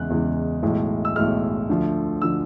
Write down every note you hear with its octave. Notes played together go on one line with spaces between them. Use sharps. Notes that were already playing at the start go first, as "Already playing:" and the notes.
Already playing: E2 C#3 E3 G#3 F#6
E2 C#3 E3 G#3
B1 A2 E3 G#3
E6
B1 A2 E3 G#3 F6
D2 D3 F3
D3 F3 E6